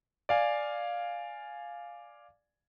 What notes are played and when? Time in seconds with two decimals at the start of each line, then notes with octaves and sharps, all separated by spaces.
0.29 D5 F5 G#5